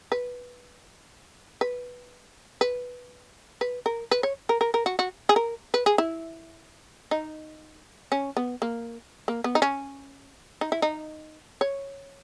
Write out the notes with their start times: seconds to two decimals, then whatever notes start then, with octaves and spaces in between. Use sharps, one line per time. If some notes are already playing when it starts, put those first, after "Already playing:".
0.12 B4
1.61 B4
2.61 B4
3.61 B4
3.86 A#4
4.11 B4
4.23 C#5
4.49 A#4
4.61 A#4
4.74 A#4
4.86 F#4
4.99 F#4
5.29 G#4
5.36 A#4
5.74 B4
5.86 G#4
5.98 E4
7.11 D#4
8.12 C#4
8.37 B3
8.62 A#3
9.28 A#3
9.44 B3
9.55 D#4
9.62 C#4
10.61 D#4
10.72 E4
10.82 D#4
11.61 C#5